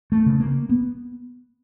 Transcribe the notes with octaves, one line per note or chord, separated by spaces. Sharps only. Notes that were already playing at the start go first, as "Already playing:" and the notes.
A3
C#3
A#3
B3